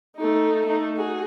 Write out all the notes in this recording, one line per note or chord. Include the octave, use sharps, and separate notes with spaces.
A3 D#4
A3 D#4
F#4 G#4